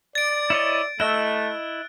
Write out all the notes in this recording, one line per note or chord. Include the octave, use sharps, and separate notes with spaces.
D5 A6 D7
E4 C#5 D#5
A3 E4 D#5 E6 F#6